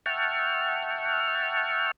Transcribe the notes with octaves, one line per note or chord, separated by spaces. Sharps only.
E5 F#5 G5 A5 C#6 F6